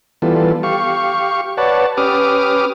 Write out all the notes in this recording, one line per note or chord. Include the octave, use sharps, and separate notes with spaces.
E3 G3 B3 F4 A4
G4 F5 C#6
B4 C#5 D5 F#5 A5
C#4 G4 B4 D6 D#6 F6